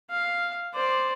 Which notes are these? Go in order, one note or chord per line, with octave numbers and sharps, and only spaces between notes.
F5
C5 D5